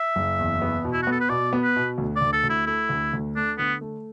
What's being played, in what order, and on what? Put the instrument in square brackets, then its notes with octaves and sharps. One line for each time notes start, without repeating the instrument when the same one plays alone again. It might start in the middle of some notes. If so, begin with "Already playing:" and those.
Already playing: [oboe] E5
[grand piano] F#1
E2
B3
B2
[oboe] E4
F#4
[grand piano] B3 [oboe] A4
[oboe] B4
[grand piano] B2 [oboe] D5
[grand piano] B3
[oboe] B4
[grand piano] B2
D2
[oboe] D5
[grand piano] D2
[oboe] A4
[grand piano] D2
[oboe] E4
[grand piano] A3 [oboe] E4
[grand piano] D2
D2
[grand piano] A3 [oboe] D4
[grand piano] D3 [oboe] B3
[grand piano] A3